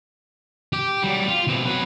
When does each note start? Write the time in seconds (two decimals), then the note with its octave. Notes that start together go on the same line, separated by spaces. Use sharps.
0.73 G4
1.03 F#3 G3
1.28 F4
1.47 B2 C4
1.65 F#3 B4